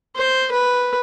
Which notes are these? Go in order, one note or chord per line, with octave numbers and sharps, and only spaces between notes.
C5
B4